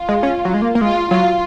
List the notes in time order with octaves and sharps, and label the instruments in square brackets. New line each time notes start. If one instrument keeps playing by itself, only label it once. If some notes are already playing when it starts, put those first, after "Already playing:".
Already playing: [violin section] F4
[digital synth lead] G#3
C#4
F#3
G#3
A#3
A#3
[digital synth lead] G#3 [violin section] F4
[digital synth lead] F#3 [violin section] F4